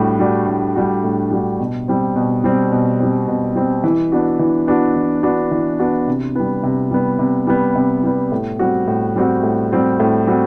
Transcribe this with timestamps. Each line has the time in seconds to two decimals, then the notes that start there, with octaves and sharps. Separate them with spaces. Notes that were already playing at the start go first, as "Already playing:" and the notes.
Already playing: A2 G3 D4 F#4
0.19 G3 D4 F#4
0.48 A2
0.75 G3 D4 F#4
1.04 A2
1.31 G3 D4 F#4
1.59 B2
1.88 G3 C4
2.16 B2
2.44 G3 C4
2.72 B2
2.99 G3 C4
3.28 B2
3.56 G3 C4
3.84 E3
4.12 B3 D4 F#4
4.39 E3
4.67 B3 D4 F#4
4.96 E3
5.23 B3 D4 F#4
5.51 E3
5.79 B3 D4 F#4
6.07 C3
6.35 G3 B3
6.63 C3
6.91 G3 B3
7.19 C3
7.47 G3 B3
7.75 C3
8.04 G3 B3
8.32 A2
8.59 G3 C4 F#4
8.88 A2
9.16 G3 C4 F#4
9.43 A2
9.72 G3 C4 F#4
10.00 A2
10.27 G3 C4 F#4